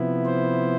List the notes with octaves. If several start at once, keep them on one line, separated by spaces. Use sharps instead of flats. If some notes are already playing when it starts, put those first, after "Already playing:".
Already playing: C3 F3 B3 E4
C5